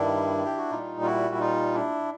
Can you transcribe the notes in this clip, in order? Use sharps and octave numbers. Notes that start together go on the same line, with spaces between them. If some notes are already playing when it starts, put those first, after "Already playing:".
Already playing: G2 D#3 G3 D4 E4
G4
F#4
A#2 G3 D#4 F4
F4
E4 F#4
E4
D#4 F4
D4 E4